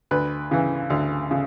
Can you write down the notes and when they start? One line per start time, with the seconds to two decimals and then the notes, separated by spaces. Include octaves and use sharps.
0.11 D2 B4
0.51 C#3 E3
0.90 D2
1.31 C#3